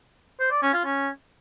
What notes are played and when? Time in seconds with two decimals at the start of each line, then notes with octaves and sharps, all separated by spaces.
0.40 C5
0.51 D5
0.62 C#4
0.73 F4
0.85 C#4